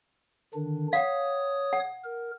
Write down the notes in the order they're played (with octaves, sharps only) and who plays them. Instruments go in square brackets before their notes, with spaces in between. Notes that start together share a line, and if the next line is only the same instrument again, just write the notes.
[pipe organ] D3 D#3 D4
[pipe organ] C#5 D#6 [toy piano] F5 F#5
[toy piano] F#5
[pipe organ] A#4